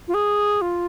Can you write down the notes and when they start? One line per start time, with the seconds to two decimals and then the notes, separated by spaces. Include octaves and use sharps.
0.08 F4
0.14 G#4
0.62 F4